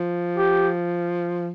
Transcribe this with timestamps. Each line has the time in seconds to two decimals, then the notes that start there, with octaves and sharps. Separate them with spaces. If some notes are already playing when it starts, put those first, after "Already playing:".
Already playing: F3
0.37 G4